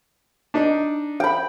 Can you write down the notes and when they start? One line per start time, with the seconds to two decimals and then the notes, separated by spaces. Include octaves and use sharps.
0.54 D4 D#4
1.20 G5 B5